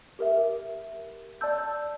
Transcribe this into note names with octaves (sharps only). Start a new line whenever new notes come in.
G4 A#4 E5
D5 A5 E6 G6